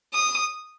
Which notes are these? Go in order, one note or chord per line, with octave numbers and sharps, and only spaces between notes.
D#6